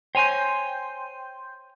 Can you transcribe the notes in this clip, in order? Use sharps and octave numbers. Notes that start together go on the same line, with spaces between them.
C5 C#5 G5 G#5 C6 G6